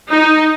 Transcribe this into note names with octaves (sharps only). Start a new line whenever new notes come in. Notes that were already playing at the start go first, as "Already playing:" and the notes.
D#4